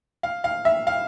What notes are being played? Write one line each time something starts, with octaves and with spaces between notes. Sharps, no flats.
F5
F5
E5
F5